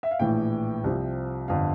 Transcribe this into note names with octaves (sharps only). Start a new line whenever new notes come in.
E5
F5
A#1 A2 E3 G5
C2 C3 F3
G1 F2 D3 F5